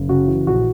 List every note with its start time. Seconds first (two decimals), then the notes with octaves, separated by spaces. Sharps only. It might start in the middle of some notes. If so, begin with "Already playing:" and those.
Already playing: F#1
0.08 C#3 F#4
0.27 E3
0.47 A#1 F#4